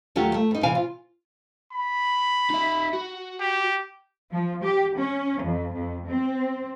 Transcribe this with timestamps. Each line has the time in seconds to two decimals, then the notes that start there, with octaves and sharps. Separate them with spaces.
0.16 D#2 F#3 A3 F4 G4
0.34 A3
0.51 G2 D#4
0.63 C3 E3 F5 G#5
0.75 F4
1.72 B5
2.50 D#4 E5
2.93 F#4
3.40 G4
4.31 F3
4.63 G4
4.97 C#4
5.42 F2
5.73 F2
6.07 C4